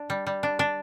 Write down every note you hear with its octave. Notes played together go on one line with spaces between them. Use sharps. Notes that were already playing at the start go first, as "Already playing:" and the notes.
Already playing: D4
G3
G3
D4
D4